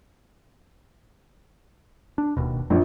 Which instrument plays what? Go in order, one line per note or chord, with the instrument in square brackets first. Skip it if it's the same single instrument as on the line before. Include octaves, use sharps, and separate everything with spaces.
[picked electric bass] D4
D1 D#2 B2
[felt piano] A#1 [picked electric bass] F#2